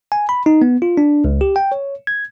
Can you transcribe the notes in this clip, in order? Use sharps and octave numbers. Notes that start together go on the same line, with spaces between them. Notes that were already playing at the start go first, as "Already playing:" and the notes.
G#5
B5
D#4
B3
F4
D4
C#2
G4
G5
C#5
G#6